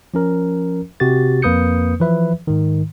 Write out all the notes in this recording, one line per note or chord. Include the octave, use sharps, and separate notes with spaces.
F3 C#4 A#4
C3 F#4 G4 A6
F2 A#3 B4 D#6 G6 C#7
E3 F3 B4 E5
G#2 D#3